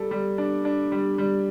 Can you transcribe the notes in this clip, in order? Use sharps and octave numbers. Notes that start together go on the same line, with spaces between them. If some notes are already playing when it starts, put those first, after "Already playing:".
Already playing: G3 A4
G3
D4
D4
G3
G3